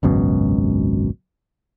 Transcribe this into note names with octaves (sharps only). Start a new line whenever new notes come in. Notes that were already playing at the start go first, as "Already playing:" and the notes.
G#1 C#2 F#2 B2